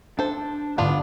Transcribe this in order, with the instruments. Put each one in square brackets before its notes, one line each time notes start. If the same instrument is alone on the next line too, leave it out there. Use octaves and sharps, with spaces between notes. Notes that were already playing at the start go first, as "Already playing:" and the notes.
[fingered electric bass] D4 [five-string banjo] A4 C5
[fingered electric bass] D2 G#2 D3 [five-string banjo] B3 D4 F4